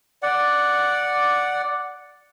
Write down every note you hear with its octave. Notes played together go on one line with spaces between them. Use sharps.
D5 F#5